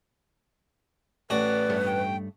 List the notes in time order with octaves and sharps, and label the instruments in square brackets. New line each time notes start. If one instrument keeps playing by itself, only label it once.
[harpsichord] A1 F#4 [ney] B4 [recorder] D5
[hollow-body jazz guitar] G2 A3 C#5
[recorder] G5